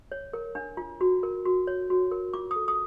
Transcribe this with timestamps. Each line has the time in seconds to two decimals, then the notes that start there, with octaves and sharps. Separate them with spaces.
0.12 C#5
0.33 A#4
0.55 D4
0.77 F4
1.01 F#4
1.23 A#4
1.45 F#4
1.67 C#5
1.90 F#4
2.11 A#4
2.33 F4 D6
2.51 D#6
2.56 A4
2.68 D#6